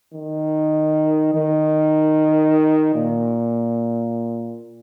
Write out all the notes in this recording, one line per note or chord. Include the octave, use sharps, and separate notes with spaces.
D#3
D#3
A#2